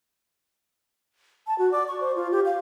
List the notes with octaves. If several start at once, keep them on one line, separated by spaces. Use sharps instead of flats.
A5
F#4
D5
C#6
C5
F4
G4
F5